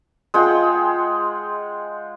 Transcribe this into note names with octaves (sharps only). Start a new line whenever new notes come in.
G#3 F4 F#5 G5